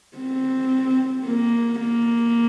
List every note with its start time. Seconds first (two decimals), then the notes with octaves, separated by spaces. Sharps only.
0.17 C4
1.25 A#3
1.80 A#3